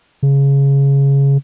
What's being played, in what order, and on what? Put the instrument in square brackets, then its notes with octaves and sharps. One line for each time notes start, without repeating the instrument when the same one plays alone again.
[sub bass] C#3